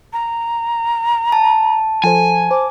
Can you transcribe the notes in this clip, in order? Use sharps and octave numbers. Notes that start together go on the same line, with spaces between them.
A#5
A5
F3 A4 C5 G#5
C5 D6